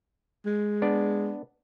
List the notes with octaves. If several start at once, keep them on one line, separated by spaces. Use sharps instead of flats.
G#3
B3 D4 D5